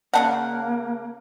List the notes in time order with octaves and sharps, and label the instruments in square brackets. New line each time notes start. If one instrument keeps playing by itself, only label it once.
[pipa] C#3 D4 F#5 [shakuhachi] A#3 [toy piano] C#5 A5